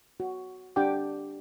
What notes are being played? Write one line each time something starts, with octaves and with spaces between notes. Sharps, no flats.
F#4
D4 G4 F#5 G5 D6